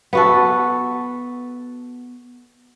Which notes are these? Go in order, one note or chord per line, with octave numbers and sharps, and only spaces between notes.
B3 F#4 A4